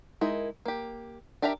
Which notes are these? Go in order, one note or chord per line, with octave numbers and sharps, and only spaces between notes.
G#3 D#4 E4 A#4
A#3 G4
D4 G4 A#4 E5 A#5